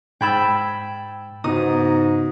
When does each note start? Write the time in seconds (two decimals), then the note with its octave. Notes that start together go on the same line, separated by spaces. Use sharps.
0.21 G#2 G5 B5 E6 G#6 A6
1.44 G#2 C#3 B3 D#4 F#4 D#6